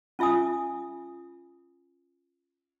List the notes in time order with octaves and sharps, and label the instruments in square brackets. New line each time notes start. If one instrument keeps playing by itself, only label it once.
[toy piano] C#4 F4 E5 G#5 D#6